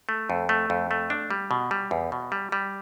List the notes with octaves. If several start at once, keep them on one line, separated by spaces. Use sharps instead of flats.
A3
F2
A3
F2
A3
D4
G3
B2
G3
E2
B2
G3
G3